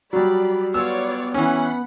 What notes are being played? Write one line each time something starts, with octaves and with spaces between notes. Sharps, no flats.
F#3 G3 D5 B5
B3 F4 C#5 D5 E6
E3 C#4 F#5 B5